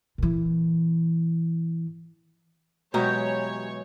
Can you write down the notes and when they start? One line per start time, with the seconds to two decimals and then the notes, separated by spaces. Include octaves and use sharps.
0.18 A#2 E3
2.94 B2 E3 F#3 G#3 G4 C#5 A#5